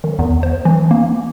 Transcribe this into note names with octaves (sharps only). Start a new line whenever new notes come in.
D#3
E2
C5
E3
A#3